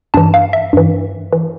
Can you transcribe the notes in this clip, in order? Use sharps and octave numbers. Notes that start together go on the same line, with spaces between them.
G2 E3 A5
F5
E5
G2 E3
E3